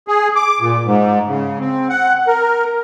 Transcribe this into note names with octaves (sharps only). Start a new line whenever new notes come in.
G#4
D6
A#2
G#2
C#3
C4
F#5
A#4